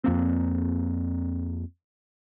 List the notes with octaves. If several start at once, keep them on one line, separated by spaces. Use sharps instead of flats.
F2 A#3 C4